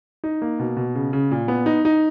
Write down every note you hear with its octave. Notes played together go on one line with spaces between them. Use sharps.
D#4
A#3
B2
B2
C#3
C#3
A#2
B3
D#4
D#4